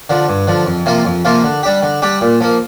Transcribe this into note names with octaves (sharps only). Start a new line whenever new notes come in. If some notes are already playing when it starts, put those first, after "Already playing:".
D3 F3
G2
D3 F3
F2
C3 F3 A#3 F4
F2
C3 F3 A#3 F4
D3
G3 D4 G4
D3
G3 D4 G4
A#2
F3 A#3